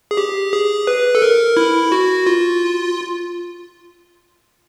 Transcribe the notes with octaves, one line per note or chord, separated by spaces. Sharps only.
G#4
G4
G#4
B4
A4
A#4
E4
F#4
F4